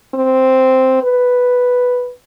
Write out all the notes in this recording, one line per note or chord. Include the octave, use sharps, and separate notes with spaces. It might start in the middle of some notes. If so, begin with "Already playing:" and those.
C4
B4